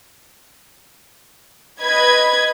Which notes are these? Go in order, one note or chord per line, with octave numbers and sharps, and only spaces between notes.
B4 D#5 B5 G#6